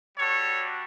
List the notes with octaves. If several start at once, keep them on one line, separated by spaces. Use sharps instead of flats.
G3 D4 F#4 A4 C#5